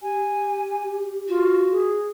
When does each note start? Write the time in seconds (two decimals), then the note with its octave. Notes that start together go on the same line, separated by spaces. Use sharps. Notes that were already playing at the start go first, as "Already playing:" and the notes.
0.03 G4 G#5
1.28 F4 F#4
1.72 G#4